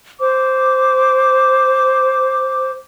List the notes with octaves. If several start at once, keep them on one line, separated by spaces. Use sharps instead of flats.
C5 D6